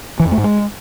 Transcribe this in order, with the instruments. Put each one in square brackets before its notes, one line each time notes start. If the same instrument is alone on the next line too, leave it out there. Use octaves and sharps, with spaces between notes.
[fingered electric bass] E3
F2
A3
G#2
G#3